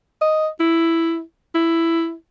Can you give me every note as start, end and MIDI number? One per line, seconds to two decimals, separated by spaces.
0.21 0.48 75
0.60 1.21 64
1.55 2.14 64